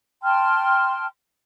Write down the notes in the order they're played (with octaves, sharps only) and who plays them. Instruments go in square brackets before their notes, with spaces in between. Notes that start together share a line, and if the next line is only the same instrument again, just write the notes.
[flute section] G5 A5 C6 F6